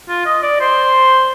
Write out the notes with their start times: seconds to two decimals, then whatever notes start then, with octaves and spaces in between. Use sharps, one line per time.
0.09 F4
0.26 D#5
0.42 D5
0.60 C5